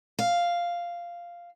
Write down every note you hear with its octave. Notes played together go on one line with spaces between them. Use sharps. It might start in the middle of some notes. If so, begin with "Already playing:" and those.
F5